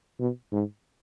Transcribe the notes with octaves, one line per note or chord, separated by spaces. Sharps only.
B2
G#2